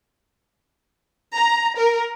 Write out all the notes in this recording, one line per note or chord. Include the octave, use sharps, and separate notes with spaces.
A#5
A#4